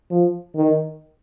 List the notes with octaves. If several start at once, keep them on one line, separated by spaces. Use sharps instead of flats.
F3
D#3